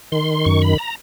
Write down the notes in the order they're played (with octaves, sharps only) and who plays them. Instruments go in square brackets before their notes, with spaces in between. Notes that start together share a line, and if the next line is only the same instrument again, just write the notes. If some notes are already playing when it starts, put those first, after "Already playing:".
[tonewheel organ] D#3 C6
F#2 C#6
B5
A#5